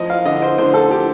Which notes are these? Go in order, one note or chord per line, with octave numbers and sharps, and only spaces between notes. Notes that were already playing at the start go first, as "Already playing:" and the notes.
Already playing: F2 F3 D#5
F5
D3 D#5
C5
D3 C5
A4
F3 G4